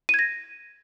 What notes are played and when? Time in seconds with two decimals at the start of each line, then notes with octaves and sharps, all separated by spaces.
0.09 D#7
0.14 G#6
0.19 A#6